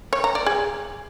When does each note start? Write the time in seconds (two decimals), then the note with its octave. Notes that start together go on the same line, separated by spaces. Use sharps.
0.13 C#5
0.24 A#5
0.35 D5
0.46 G#4